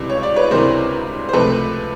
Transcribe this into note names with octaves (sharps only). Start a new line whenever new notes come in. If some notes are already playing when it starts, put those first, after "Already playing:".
Already playing: C#2 C3 E3 G3 C4
C#5
D5
B4 C#5
C#2 C3 E3 G3 C4 A#4 C5
C5
C#2 C3 F3 A3 A4 B4